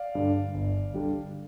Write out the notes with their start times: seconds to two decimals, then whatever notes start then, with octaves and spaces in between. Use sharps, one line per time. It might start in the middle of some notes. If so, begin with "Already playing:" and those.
Already playing: D5 F5
0.15 G2 D3 G3
0.54 G1
0.94 D3 G3